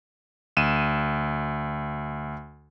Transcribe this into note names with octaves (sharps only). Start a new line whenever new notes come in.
D2 D#7 E7